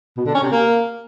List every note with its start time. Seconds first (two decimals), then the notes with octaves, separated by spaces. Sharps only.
0.17 B2
0.26 D3
0.34 C#4
0.43 C3
0.52 A#3